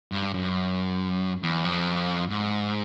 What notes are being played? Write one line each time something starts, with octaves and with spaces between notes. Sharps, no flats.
G2
F#2
E2
F2
G#2